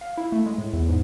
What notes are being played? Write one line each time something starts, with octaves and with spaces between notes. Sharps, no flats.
F5
E4
A3
G#3
A2
E2
G#2